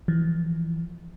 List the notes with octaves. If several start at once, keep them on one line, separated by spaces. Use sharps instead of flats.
E3 F3